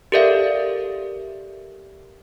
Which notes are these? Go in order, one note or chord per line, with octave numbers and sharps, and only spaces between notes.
G4 A4 A#4 D5 E5 F5